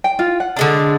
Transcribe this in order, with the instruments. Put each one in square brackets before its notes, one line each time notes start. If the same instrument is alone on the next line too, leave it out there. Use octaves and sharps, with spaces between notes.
[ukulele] G5
F4
F#5
[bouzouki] D3 G#3 D4